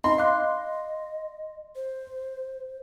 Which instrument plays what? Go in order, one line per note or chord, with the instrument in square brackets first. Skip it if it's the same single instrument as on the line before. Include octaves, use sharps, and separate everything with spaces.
[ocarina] D#4 [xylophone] D#5 B5 [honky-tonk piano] C6
[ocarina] D#5 [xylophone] F5 D6 F#6
[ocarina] C5